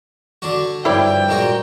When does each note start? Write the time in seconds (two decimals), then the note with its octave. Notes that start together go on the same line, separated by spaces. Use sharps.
0.42 D3 D4 F#4
0.85 G2 F3 E4 C#5 D5 G5
1.29 A#2 G#3 F#4